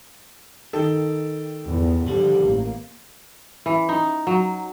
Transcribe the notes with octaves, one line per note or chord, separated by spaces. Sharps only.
D#3 A4 G5
E2
D3 F3 G3
A1 A#3
E3
D#4
F#3